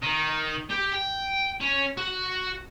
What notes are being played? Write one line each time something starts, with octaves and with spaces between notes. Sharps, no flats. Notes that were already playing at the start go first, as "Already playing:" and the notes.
D#3
G4
G5
C#4
F#4